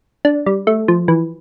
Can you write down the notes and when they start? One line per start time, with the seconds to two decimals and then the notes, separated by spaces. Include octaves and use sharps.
0.25 D4
0.46 G3
0.67 A3
0.88 F3
1.08 E3